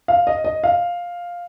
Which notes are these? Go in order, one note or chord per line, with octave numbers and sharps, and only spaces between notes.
F5
D#5
D#5
F5